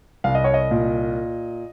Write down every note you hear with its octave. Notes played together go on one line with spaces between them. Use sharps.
C2 F5
D#5
C#5
D#5
A#2